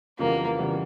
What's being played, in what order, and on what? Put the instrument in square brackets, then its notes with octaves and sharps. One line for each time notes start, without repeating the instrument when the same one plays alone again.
[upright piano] F2 C#3 E3 G3 B3 [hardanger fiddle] A#3
[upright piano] C#3 E3 G3 B3